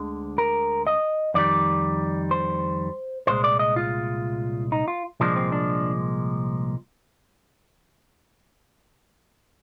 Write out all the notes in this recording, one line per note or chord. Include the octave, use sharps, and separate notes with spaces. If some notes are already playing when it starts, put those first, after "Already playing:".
Already playing: D2 D3 G#3
A#4
D#5
F2 D#3 G3 D5
C5
C2 A#2 G#3 C5
D5
D#5
F4
D#4
F4
C2 A#2 F3 G#3 D4
C4
D4